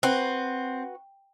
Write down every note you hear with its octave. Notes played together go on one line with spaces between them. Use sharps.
C4 F#4 B4